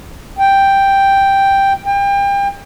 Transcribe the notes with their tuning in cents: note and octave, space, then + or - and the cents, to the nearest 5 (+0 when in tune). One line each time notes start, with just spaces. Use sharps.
G5 +0
G5 +30